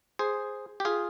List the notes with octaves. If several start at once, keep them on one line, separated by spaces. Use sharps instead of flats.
G#4 C5
G4
F4 G#4